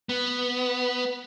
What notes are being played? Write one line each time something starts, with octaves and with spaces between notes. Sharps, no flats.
B3